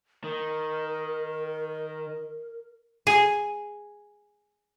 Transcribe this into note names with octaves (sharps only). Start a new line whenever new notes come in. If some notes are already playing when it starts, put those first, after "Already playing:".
D#3 A#4
G#4 G#5